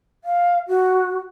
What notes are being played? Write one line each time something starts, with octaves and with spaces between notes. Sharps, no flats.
F5
F#4